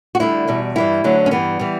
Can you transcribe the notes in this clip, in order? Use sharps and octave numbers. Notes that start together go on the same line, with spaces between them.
F#4
D2 D3 G3 E4
E2 B2 G3
G2 E3 G3 E4
D2 D3 F#3
C#4
G2 E3 G3 B3
E3 G3